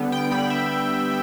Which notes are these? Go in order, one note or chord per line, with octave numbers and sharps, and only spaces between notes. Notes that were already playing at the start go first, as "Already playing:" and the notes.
Already playing: D3 G3 B3
G5
D3 G3 B3 B5
E5